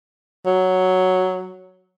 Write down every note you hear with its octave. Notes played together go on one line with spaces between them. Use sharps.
F#3